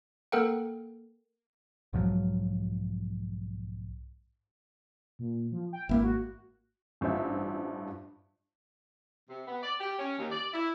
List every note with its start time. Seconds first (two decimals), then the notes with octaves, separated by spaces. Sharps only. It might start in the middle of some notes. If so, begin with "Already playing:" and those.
0.32 A#3 A4 A#4 F#5 G5
1.93 B1 G#2 F3 F#3
5.19 A#2
5.52 F3
5.73 G5
5.89 G#1 A#3 E4
6.03 F#4
7.01 A1 G2 F4 C5 E5
9.29 C3
9.47 B3
9.63 D5
9.80 G4
9.99 C#4
10.18 D#2
10.31 D5
10.54 E4